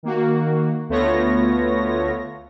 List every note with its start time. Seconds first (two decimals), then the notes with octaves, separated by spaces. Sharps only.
0.03 D#3 A#3 F#4
0.89 D2 A3 B3 F4 C#5 A#6